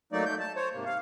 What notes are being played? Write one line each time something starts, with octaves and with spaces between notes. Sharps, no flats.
F#3 A3 A#3 D#4 D5
A3 G6
A5
C5 C#5
G#2 C3 A#3
F5